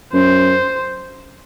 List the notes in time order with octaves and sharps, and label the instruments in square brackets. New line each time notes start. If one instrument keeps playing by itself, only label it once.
[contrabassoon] F#2 [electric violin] C5